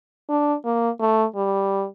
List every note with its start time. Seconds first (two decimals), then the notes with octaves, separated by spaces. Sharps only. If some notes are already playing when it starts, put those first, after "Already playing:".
0.29 D4
0.65 A#3
1.00 A3
1.36 G3